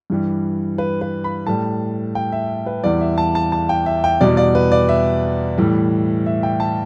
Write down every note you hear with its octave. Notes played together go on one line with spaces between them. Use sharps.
G2 E3 G3
B4
B4
B5
A2 G3 A5
G5
E5
B4
E2 E3 G3 D5
E5
A5
A5
A5
G5
E5
G5
E2 B2 G3 D5
D5
B4
D5
E5
A2 E3 G3
E5
G5
A5